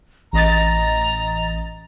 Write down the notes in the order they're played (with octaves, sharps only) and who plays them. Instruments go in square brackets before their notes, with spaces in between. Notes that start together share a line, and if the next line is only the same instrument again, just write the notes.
[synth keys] A1 D#5 A6 [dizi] A#5